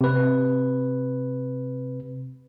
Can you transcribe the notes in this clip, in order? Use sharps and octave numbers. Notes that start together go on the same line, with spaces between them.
C3 B4